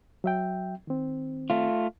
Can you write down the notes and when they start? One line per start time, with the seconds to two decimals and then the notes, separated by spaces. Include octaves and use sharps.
0.24 F#3 E5 G5
0.87 D#3 C4
1.50 A3 F4